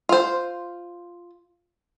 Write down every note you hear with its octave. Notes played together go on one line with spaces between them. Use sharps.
F4 C5